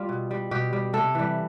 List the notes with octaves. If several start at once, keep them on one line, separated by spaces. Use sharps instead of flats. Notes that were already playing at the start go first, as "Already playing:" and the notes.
Already playing: G3 F4
B2
G3
B2 G4
G3
C3 A4
E3 G3